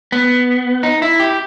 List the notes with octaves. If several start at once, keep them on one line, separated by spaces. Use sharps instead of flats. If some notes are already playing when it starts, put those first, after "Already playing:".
B3
D#4
E4
G4